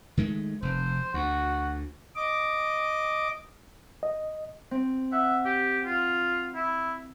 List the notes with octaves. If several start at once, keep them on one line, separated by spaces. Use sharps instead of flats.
D#3 G#3 A3
F1 C5
D2 F#4
D#5 D6
D#5
C4
E5 F#5
G4
F4
E4